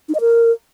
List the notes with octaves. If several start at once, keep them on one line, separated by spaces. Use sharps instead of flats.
D#4
D#5
A#4